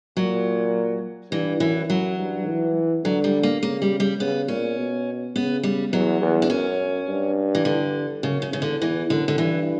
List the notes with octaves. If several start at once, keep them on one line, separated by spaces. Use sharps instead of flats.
A#2 F#3
G2 E3
F#2 E3
F#2 F#3
G2
E3
D3 F#3
G3
A#3
C#3 A#3
G3
G3
C#3 B3
A#2 C#4
B2
C#3 B3
G3
E2 F#3
E2
D4
F#2 C#4
G2
E3
D3
F#2 C#3
C#3
E2 C#3
D3
E2 E3
F#2 D3
D3
G2 E3